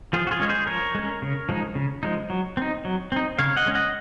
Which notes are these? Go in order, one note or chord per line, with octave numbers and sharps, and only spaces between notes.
F3 F4 G#4
F#4
F4 G#4
G#3 C#4 C#5
G#4 C5
F3 A#4 C#5
G#3 C#4
C#3
F3 G#3 D#4
C#3
F3 G#3 D#4
F#3
C4 D#4
F#3
C4 D#4
C#3 C#5 F5
D#5 F#5
G#3 C#4
D#5 F#5